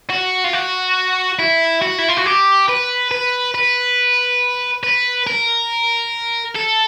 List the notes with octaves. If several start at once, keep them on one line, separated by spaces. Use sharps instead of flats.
F#4
F4
F#4
E4
F#4
E4
F4
F#4
G4
B4
B4
B4
B4
A#4
A4